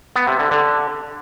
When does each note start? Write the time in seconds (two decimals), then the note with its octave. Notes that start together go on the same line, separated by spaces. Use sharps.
0.16 B3
0.27 C3
0.39 D3
0.51 D3